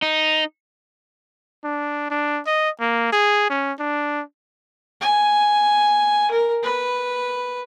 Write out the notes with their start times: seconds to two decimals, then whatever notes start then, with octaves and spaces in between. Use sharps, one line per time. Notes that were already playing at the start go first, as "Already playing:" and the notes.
0.02 D#4
1.65 D4
2.11 D4
2.47 D#5
2.81 A#3
3.13 G#4
3.50 C#4
3.80 D4
5.01 G#5
6.31 A#4
6.63 B4